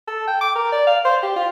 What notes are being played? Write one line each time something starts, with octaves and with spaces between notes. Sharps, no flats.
A4
G5
D6
A#4
D5
F5
C5
G4
F4